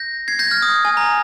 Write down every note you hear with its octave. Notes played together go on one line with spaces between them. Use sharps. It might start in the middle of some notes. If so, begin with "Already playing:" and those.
Already playing: G6 A#6
G#6 C7
G6 A#6
F6 G#6
D#6
G#5
A#5